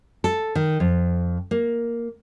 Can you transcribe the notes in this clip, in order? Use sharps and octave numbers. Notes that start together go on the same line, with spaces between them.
A4
D#3
F2
A#3